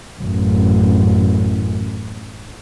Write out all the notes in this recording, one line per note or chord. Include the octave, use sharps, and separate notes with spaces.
A1 F#2